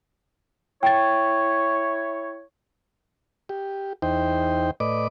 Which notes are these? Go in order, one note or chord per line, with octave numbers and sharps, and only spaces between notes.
E4 C#5 G5 A6
G4
E2 D#4 C5 G5
A2 B4 D5 D#5 D6